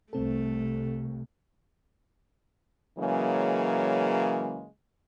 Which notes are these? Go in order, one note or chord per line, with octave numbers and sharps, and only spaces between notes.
C2 A3 C4 A4
C#3 E3 F#3 G#3 A#3